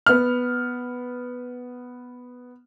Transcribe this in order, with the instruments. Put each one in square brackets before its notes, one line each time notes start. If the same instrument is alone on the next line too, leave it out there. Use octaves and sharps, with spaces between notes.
[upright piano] B3 F6